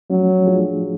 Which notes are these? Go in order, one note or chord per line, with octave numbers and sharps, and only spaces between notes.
F3 F#3 A3 C#4
F3 A3 D4 F4 G#4